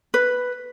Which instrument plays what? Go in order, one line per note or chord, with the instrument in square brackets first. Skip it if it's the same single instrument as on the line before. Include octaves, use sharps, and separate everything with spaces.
[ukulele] B4